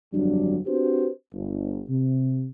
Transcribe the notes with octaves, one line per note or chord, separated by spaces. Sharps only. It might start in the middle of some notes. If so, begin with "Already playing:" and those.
G1 F2 F#3 G3 D4
C4 D4 F#4 G4 B4 C5
G1
C3